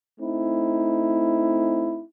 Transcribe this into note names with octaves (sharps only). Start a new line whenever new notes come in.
A3 C4 D#4 E4